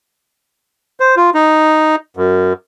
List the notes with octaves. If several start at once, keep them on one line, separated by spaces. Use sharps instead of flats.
C5
F4
D#4
F#2